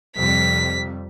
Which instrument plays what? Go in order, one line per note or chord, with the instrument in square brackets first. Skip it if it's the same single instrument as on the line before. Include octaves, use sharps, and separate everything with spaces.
[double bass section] F2 C3 G3 [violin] B6